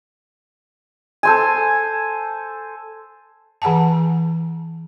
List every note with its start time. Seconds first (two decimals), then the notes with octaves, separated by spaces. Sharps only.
1.23 A4 C5 G#5
3.62 E3 G#4 F#5 G#5 A5